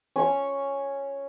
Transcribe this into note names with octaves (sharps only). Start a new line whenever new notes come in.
C#4 C#5 C#6